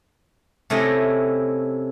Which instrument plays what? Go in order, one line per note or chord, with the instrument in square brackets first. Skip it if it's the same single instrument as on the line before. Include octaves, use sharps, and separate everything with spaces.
[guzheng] C3 A3 C#4 E4 D#5 G5